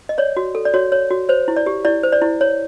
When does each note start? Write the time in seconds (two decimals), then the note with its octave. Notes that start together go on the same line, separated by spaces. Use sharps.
0.09 D#5
0.18 C#5 D5
0.37 F#4
0.55 A4
0.65 D5
0.74 F#4 C#5
0.92 C#5
1.11 F#4
1.29 C5 C#5
1.48 E4
1.56 D5
1.66 G4
1.85 E4 D5
2.03 C5
2.12 D5
2.22 E4
2.41 C#5